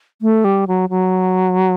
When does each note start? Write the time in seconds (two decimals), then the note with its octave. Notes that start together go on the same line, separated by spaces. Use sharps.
0.22 A3
0.44 G3
0.67 F#3
0.89 F#3